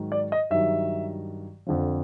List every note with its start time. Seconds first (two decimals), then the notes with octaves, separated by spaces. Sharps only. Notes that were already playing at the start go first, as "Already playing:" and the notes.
Already playing: G#2 D#3 F#3
0.12 D5
0.32 D#5
0.50 G2 D#3 F#3 E5
1.66 F2 D3 F3